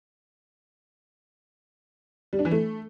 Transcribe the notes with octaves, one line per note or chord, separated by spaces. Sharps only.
G3
D4
E3
A3